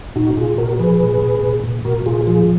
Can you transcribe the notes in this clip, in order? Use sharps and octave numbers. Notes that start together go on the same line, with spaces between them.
A#2 D#4 F#4
A#2 F4 G#4
A#2 F#4 A#4
F3 G#4 B4
A#2
A#2
A#2
A#2
A#2 F#4 A#4
A#2 F4 G#4
F3 F4 G#4